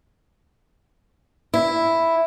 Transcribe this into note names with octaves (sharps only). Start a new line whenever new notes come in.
E4